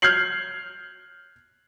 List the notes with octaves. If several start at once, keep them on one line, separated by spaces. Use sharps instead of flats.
F6 G6 G#6 C7 F#7